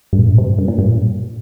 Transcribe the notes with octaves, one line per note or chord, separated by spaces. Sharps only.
G2
A#2
G2
C3
G2
G2
A#2
G2
A#2